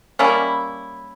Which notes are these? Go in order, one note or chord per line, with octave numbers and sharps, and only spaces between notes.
G3 A#3 C#4 E4